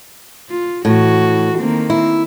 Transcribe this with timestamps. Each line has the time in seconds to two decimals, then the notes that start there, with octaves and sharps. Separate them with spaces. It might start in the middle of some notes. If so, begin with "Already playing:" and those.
0.50 F4
0.85 A2 E3 F#4
1.59 D#3 A#3 C4
1.90 E4